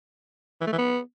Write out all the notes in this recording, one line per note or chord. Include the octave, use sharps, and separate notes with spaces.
E3
A3
E3
B3